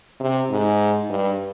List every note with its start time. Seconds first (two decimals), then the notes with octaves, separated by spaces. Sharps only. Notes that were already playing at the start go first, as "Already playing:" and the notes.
0.20 C3
0.50 G#2
1.10 G2